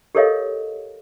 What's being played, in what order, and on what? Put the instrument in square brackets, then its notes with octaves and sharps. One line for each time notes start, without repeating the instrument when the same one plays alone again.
[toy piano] G4 A4 A#4 C#5 D#5 F5